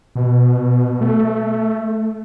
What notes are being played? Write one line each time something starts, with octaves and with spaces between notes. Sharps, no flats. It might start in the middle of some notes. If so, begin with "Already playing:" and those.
B2
A3